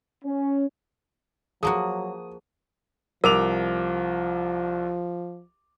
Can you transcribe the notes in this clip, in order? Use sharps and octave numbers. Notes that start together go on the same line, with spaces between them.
C#4
F3 F#3 A#3 F#4 G#4 D#6
C2 F3 A#4 D6 F7